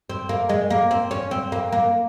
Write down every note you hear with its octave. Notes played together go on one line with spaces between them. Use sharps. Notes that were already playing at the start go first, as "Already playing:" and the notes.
C4
A#3
G#3
A#3
C4
C#4
C4
A#3
A#3